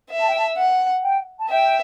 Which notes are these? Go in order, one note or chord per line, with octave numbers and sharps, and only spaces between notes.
E5
A5
G5
A5
F#5
G5
A5
E5 G5